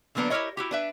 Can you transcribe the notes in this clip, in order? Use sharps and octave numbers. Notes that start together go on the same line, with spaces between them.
D3 F#3 A#3 B3 D4
E4 G4 A4 A#4 C#5 D#5
E4 F#4 G4
D4 B4 E5